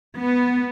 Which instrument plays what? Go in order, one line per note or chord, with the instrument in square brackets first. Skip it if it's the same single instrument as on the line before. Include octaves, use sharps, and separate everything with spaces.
[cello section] B3